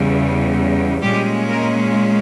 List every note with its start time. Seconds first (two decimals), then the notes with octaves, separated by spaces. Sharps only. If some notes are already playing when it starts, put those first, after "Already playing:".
Already playing: E2 C#3 G3
1.01 A#2 G3 G#3 C#4 G4
1.49 A#3 A#4